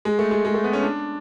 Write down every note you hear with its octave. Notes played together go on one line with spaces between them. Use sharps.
G#3
A3
G#3
G#3
A3
B3
C#4
D4